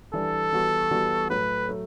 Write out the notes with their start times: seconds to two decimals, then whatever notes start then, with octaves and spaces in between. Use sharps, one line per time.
0.13 E3 G3 D4 A4
0.52 E3 G3 B3 F#4
0.91 E3 G3 B3 F#4
1.30 A2 F#3 A3 B4
1.69 F#3 A3